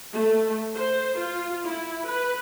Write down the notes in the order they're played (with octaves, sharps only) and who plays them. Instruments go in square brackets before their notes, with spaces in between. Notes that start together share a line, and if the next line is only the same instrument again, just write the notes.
[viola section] A3
C5
F4
E4
B4